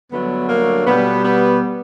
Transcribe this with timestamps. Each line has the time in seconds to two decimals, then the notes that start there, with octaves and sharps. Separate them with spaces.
0.10 G2 D3 F#3 A3 B3
0.49 A#3
0.87 B2 G3 B3
1.24 B3